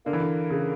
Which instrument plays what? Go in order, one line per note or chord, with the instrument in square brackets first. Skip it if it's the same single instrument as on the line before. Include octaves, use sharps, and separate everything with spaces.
[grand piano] D3 [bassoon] A#3
[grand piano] E3
D3
C#3